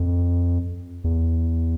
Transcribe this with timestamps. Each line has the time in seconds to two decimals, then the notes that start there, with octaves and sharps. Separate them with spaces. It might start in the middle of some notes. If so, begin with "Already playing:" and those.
Already playing: F2
1.04 E2